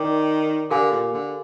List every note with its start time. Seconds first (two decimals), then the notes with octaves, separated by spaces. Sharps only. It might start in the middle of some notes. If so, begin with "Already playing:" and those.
Already playing: D#3 A#4 D5 G5 D6
0.70 D3 G4 A#4 F5 G#5 D6
0.91 A#2
1.13 D3